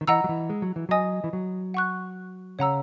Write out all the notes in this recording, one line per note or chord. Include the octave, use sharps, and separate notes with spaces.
D#3
E3 D#5 F#5 A#5 E6
F#3
E3
G#3
F#3
E3
F#3 D#5 G#5 D#6
E3
F#3
F#5 C#6 F#6
C#3 C#5 F#5 A#5 E6